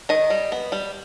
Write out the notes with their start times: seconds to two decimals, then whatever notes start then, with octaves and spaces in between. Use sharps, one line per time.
0.09 D#3 D#5
0.30 G3
0.52 B3
0.72 G3